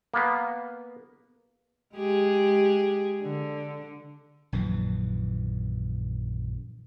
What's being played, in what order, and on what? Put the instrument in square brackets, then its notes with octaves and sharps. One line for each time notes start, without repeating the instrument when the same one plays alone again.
[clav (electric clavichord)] A#3 B3
[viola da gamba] G#3 G4 G#4
D3
[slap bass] A#1 F#2 D#3 E3